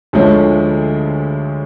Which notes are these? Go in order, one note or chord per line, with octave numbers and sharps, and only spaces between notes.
D2 D3 F3 G#3 C#4